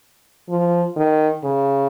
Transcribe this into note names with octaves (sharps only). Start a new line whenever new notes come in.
F3
D#3
C#3